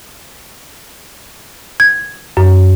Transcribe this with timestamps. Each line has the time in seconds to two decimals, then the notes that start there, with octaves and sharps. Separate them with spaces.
1.80 G#6
2.37 F#2